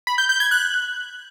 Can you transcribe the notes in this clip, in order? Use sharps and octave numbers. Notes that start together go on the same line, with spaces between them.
B5
G6
G6
G#6
F#6